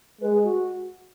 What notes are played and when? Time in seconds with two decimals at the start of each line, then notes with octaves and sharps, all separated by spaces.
0.21 G#3 B4
0.33 G#4
0.44 F#4